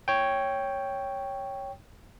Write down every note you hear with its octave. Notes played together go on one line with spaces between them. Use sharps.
C#5 G5